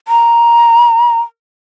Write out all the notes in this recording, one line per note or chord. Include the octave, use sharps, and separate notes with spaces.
A#5